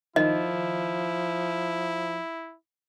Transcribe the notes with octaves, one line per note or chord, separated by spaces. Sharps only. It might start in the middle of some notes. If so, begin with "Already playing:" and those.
D#3 F3 E4 D#5